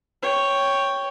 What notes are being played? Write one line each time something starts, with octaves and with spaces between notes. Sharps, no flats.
C#5 G5